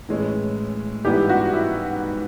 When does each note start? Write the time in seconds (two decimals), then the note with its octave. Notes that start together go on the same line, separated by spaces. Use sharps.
0.09 A2 E3 G#3 C#4
1.05 G#2 E3 G3 B3 E4 G4
1.29 F#4
1.53 E4